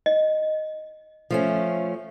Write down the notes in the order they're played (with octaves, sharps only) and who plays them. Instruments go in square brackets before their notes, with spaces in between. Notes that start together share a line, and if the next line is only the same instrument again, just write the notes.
[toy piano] D#5
[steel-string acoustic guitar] F3 A3 C#4